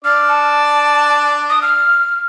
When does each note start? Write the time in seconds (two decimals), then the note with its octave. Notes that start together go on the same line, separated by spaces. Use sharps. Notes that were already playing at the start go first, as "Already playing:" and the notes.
0.05 D4 D5 F6
0.29 A5
1.50 D#6
1.62 F6